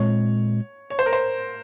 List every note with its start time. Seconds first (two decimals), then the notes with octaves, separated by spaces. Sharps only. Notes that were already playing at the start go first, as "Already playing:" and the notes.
Already playing: A#2 G#3 C4 C#5
0.90 C#5
0.99 C5
1.06 A#4
1.13 C5